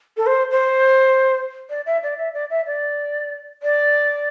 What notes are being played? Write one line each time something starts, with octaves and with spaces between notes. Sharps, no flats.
A4
C5
C5
D5
E5
D5
E5
D5
E5
D5
D5